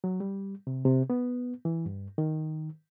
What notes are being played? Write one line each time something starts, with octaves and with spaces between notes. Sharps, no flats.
F#3
G3
C3
C3
B3
E3
G2
D#3